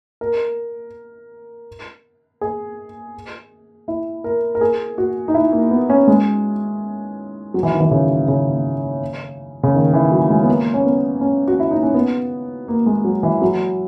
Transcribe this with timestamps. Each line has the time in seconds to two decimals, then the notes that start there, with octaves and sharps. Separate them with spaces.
0.21 A#4
2.41 G#4
3.88 E4
4.24 A#4
4.55 A#4
4.61 G#4
4.98 F#4
5.28 D#4
5.34 E4
5.52 A#3
5.71 B3
5.90 C#4
6.08 G#3
7.54 F#3
7.63 E3
7.72 D#3
7.80 E3
7.91 C#3
8.28 C#3
9.63 C#3
9.74 D#3
9.93 E3
10.12 F#3
10.30 G#3
10.43 B3
10.48 A#3
10.74 C#4
10.85 B3
11.21 C#4
11.48 F#4
11.60 E4
11.71 D#4
11.83 C#4
11.94 B3
12.68 A#3
12.86 G#3
13.05 F#3
13.23 E3
13.42 F#3